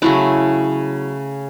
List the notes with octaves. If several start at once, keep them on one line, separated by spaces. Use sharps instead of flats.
C#3 F#3 A3 E4